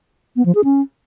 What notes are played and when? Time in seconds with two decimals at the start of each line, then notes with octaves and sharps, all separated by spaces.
0.36 B3
0.45 F3
0.55 G#4
0.64 C#4